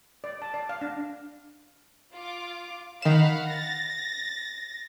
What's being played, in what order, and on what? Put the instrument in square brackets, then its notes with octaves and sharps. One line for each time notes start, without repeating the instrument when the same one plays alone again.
[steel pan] D5
A5
D5
F5
D4
[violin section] F4 D6
[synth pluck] D#3 E7 [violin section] F5 F#5 B5
[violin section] A6 A#6